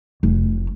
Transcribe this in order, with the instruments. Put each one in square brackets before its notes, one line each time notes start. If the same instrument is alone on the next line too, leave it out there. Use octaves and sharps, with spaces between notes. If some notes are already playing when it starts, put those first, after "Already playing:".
[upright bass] F1